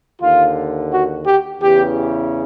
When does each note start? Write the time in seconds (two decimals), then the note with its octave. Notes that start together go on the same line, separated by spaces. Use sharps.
0.21 D#2 D3 F4
0.91 F#4
1.26 G4
1.61 E2 C#3 E3 G4